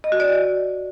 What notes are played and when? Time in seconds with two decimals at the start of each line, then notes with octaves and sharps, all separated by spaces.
0.04 D#5
0.12 F#4
0.20 D5
0.28 D#5